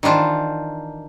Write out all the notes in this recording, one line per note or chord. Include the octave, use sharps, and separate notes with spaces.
D#3 E3 D4 F4 C5